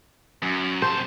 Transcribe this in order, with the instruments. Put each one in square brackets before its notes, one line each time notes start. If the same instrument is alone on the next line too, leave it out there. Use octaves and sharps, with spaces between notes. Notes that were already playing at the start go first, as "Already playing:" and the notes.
[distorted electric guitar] F#2
[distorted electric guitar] C3 A5 [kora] C5